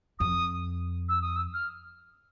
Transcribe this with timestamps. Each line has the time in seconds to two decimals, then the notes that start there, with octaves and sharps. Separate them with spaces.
0.19 F2 D#6
1.09 E6
1.22 D#6
1.36 E6
1.54 F6